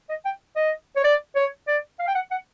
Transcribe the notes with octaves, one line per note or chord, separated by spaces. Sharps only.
D#5
G5
D#5
C#5
D5
C#5
D5
F5
G5
F#5
F#5